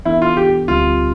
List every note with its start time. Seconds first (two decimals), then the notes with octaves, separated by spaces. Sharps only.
0.05 E3 B3 D4 E4 A4
0.22 F4
0.37 G4
0.68 D2 D3 G3 C4 F4 G4